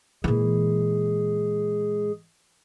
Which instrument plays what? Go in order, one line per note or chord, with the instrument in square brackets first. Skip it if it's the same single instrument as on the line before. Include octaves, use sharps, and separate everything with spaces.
[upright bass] A#2 E3 [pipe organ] G#3 G#4